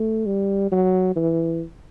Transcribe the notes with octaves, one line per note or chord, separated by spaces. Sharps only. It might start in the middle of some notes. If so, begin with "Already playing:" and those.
Already playing: A3
G3
F#3
E3